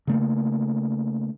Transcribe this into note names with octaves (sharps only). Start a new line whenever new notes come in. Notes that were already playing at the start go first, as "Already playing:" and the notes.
C#3 A3 A#3